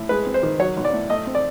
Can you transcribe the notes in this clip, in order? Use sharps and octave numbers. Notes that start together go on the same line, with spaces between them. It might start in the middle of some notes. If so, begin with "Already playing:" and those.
Already playing: A2
G#3 B4
C4
C5
D#3
F#3 C#5
B1
D5
A2
A3 D#5
C4
D5